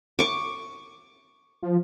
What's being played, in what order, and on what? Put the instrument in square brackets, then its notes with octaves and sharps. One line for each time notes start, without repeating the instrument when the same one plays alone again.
[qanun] C#6 D6
[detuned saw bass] F3